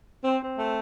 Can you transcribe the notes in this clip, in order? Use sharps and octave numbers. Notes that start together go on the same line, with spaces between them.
C4
C4
A3